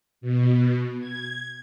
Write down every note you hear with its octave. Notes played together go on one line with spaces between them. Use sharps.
B2
G#6